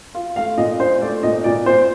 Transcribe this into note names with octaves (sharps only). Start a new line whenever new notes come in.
F4
A3 F5
A#2 D#5
D4 C5
A3 D5
A#2 D#5
A#2 D5
A#2 C5